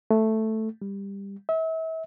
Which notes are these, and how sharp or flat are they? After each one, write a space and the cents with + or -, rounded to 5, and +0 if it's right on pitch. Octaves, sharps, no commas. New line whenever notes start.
A3 +0
G3 +15
E5 -35